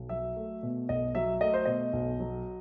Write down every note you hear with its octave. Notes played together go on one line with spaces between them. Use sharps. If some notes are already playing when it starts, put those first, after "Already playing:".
Already playing: B1
F#3 E5
A3
B2
B1 D#5
F#3 E5
A3 D#5
C5
B2 D#5
B1
F#3